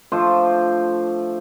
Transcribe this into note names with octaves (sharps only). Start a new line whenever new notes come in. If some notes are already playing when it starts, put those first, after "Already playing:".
F3 A3 D4 C5